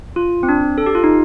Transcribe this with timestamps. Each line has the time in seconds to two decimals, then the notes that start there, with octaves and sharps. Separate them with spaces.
0.16 F4
0.43 C4
0.49 D4
0.78 A4
0.86 G4
0.95 F4
1.04 D#4